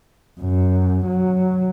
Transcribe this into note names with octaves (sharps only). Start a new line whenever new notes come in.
F#2
F#3